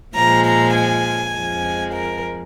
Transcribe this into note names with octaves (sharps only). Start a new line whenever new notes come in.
A#2 F3 G#3 A#5
A#5
G#5
F2 F3 G#3
A#4